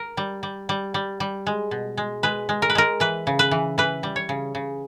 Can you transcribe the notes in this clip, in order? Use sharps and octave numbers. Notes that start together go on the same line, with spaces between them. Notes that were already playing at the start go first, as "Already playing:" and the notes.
Already playing: A#4
G3
G3
G3
G3
G3
G#3
B2
G#3
G#3 B4
G#3
A#4
B4
G#3 A#4
E3 B4
C#3
B4
E3
E3 B4
G3
C#5
C#3
C#3